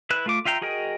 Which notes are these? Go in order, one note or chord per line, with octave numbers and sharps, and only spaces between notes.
E4 B4 F#6
A3 F4 D6
F4 E5 F5 G5 A#5
F#4 G#4 A#4 D#5 G5